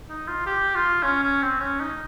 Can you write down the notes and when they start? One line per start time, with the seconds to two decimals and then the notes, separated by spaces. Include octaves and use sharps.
0.09 D#4
0.28 F4
0.46 G4
0.75 F4
1.03 C#4
1.23 C#4
1.42 C4
1.60 C#4
1.80 D#4